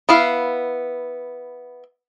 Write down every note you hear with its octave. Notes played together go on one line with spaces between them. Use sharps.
B3 E4 F5